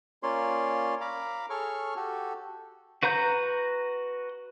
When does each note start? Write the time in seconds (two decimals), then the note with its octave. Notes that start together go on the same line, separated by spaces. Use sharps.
0.23 A#3 C#4 F4 C#5 D5 C6
1.01 F5 A#5 B5 D6
1.50 G#4 A4 C#5 C#6 F6
1.96 F#4 G4 A4
3.03 F#4 B4 F#5 A#5 G6